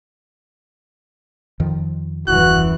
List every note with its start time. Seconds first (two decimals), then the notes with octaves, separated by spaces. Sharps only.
1.60 F2 D#3 F3
2.28 D#1 F#2 E3 F#4 F#6